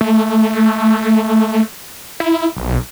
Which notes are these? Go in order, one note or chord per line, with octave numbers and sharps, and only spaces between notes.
A3
E4
B1